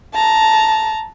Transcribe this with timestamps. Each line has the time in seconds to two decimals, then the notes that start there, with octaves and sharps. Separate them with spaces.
0.14 A5 A#5